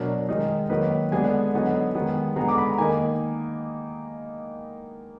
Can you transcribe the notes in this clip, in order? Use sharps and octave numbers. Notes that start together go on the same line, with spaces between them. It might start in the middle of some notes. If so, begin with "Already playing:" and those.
Already playing: B2 F#3 D4 A#4
D#3 G#3 D#4
D#3 F#3 A#3 D#4 B4
D3 G#3 B3 D4 G#5
D3 F#3 B3 D#4
D#3 G#3 B3
D3 G#3 B3 A#5
D6
B5
A#5
D#3 A#3 D#4 G#5